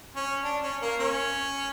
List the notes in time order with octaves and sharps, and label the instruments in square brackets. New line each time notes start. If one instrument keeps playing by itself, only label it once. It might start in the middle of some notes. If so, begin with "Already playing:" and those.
[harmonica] C#4
D4
C#4
A#3
C#4